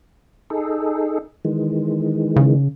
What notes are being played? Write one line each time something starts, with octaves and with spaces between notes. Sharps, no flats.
D#4 G#4 A4
D#3 E3 G#3
C#3